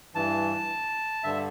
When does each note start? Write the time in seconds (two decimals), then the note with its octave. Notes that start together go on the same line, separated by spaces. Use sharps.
0.14 G2 E3 A5
1.24 G2 D3 E5